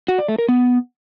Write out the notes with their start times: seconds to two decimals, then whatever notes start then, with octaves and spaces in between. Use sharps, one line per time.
0.08 F#4
0.18 D5
0.28 A3
0.39 A#4
0.49 B3